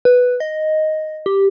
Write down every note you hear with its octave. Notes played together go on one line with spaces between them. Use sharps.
B4
D#5
G4